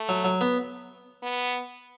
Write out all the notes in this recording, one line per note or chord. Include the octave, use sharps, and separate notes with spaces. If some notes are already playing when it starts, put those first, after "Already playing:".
Already playing: A3
F#3
F#3
B3
B3